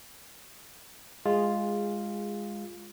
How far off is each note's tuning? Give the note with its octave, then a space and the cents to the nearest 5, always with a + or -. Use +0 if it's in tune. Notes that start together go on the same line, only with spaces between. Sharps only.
G#3 -10 F4 +0 G#4 -20